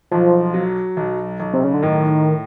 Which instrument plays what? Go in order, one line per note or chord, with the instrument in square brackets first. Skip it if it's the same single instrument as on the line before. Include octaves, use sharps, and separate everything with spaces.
[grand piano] B1 [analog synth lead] F3
[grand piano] F#3
B1
B1
[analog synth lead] C3
C#3
D3
[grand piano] A2 [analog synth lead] D#3